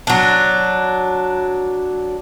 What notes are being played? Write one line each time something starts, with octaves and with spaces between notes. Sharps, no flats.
F#3 D4